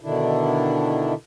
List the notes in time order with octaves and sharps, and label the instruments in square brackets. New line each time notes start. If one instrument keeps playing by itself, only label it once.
[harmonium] B2 D3 D#3 D4 E4